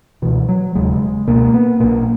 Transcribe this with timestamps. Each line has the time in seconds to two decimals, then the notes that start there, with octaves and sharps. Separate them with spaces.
0.22 C#2 B2 E3
0.49 F#3
0.75 E1 D#2 C#3 G#3
1.27 C#2 B2 A#3
1.54 B3
1.80 B1 A#2 A#3